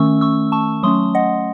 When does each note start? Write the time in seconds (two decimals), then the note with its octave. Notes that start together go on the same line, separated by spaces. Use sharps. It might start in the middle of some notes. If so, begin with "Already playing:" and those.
Already playing: D#3 A3 C#4 C#6 E6
0.21 C#6 E6
0.52 A5 C#6
0.83 F#3 A3 C#4 C6 D#6
1.15 D#5 F#5